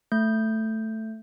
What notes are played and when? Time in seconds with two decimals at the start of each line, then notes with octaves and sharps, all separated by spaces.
0.12 A3 G6